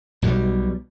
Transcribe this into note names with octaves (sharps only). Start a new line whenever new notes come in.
B1 B2 E3 G3